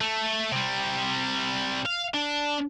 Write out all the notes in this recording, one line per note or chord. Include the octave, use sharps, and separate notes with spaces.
A3
C3 G3
F5
D4